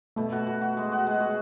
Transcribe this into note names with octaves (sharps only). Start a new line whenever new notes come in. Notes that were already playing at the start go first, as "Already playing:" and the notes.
B2 A3
F#4
F#4
F#4
G#3
F#4
G#3
F#4